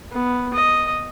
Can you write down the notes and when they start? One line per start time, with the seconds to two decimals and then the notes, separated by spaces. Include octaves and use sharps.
0.12 B3
0.54 D#5